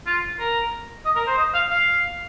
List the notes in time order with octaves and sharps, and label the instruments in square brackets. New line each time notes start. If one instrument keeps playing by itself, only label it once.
[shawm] F4
A#4
D#5
A#4
C5
D#5
F5
F5